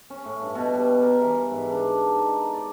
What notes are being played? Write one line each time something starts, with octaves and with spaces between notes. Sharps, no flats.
C#4
A2
G2
B2
G3
A#4
E3
G#2
D4
D#4
D5